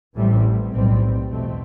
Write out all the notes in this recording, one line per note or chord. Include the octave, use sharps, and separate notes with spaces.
A1 A2 E3 G3 C4
B1 A2 G3 C4
E2 B2 A3 C4